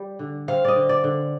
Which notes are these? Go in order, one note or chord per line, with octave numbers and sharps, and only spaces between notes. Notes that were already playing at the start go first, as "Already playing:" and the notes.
Already playing: G3
D3
C4 F5
D5 D#5
D3
D5
D3